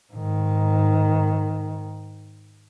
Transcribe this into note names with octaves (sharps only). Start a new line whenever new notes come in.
G#2 D#3